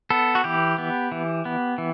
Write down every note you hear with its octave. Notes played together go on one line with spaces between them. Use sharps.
B3 A4
F#4
E3 G4
B3
E3
B3
E3